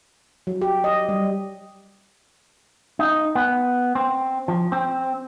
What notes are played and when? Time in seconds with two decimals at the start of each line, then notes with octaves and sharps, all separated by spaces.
0.47 F#3
0.62 G4
0.84 D#5
1.09 G3
2.99 D#4
3.35 B3
3.95 C4
4.48 F3
4.72 C4